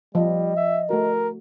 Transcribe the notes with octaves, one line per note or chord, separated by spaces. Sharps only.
F3 G3 D#5
E5
A3 F#4 A#4